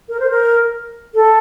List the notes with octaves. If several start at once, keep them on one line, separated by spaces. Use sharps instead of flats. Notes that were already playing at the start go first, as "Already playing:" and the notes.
A#4
C5
A#4
A4